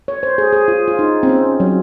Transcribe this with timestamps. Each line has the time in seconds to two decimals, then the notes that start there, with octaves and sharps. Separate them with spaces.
0.08 C#5
0.23 C5
0.38 G#4
0.53 G#4
0.68 F4
0.88 F4
0.99 D#4
1.23 C4
1.29 C#4
1.60 F#3